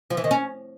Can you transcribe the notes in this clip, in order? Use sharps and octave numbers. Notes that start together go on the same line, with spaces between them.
F3
E3
D#3
C#4